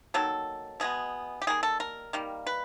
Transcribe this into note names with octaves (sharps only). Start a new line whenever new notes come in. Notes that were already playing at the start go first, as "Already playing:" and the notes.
D#3 F#3 A#3 A4
B2 G#3 B3 G#4
G4
D#3 G3 A#3 G#4
A4
A#4
D#3 G3 A#3
B4